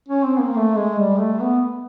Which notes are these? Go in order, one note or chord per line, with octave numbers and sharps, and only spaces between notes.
C#4
C4
A#3
A3
G#3
G3
A3
B3